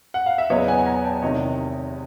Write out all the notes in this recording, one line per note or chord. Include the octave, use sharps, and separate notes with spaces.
F#5
F5
E5
E2 C#3 F#3 B3 C#5 D#5
F#5 G#5
G#5 A#5
G5 A5
F1 E2 C3 D#3 C#5 D#5